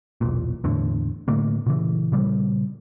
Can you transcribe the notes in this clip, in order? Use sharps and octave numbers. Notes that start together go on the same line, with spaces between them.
E1 B1 A#2
E2 A2 D3
A2 D3 A3 A#3
A#2 C#3 E3
A#2 C#3 G3